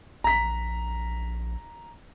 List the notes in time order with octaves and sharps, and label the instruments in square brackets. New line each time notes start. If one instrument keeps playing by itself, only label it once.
[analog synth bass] A#1 [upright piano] A#5 B6